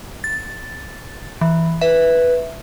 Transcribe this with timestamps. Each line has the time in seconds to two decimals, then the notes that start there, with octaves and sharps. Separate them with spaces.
0.24 A6
1.41 E3
1.81 B4 E5